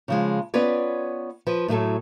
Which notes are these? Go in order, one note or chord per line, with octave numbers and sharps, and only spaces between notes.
C#3 F3 G#3
B3 C#4 F4 B4 C#5 D5
F3 B4
A2 F#3 A3 A4